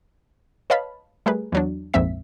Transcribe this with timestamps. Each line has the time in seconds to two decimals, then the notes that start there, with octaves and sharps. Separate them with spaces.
0.70 B4 C#5 D#5 F5 A5 B5
1.26 G3 A3 G#4 A#4 B4
1.52 E2 F#3 D4
1.94 A#1 F2 G#2 C4 E5 B6